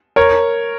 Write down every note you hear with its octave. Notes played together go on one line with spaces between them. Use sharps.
A#4 C#5